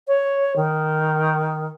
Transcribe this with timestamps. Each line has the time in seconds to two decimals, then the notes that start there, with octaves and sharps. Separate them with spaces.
0.08 C#5
0.56 D#3